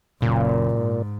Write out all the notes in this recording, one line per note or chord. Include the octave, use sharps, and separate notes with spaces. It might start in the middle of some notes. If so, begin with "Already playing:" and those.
F#1 A#2
G#2